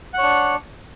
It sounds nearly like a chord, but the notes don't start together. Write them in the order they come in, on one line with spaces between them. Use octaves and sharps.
F#5 C#5 D4